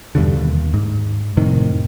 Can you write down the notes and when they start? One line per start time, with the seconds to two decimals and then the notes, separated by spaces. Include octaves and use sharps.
0.15 E2 G2 B2 D3
0.36 D#2
0.74 G#2
1.37 F2 A2 C3 D#3